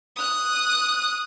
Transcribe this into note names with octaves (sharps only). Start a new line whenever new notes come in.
D#6 F#6